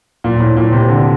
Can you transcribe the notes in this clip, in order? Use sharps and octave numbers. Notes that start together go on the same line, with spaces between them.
A#2
A2
A#2
C3
D3